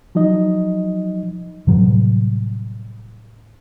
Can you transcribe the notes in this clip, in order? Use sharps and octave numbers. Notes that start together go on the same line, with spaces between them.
F3 F#3 D#4 D#5
A2 C3 F#3 G3